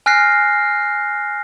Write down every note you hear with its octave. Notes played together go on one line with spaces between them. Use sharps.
G#5 F6 F#6 A#6 C7